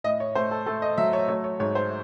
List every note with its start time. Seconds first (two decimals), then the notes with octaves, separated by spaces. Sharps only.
0.04 A2 D#5
0.20 C#5
0.35 A3 C5
0.51 A4
0.66 A3 A4
0.82 D#5
0.98 F#3 E5
1.13 C#5
1.28 A3 C#5
1.44 C#5
1.60 G#2 C#5
1.75 C5